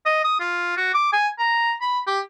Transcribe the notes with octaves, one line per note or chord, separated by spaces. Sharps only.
D#5
D#6
F4
F#4
D6
G#5
A#5
B5
G4